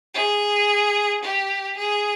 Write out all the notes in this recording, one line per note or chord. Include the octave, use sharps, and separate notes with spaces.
G#4
G4
G#4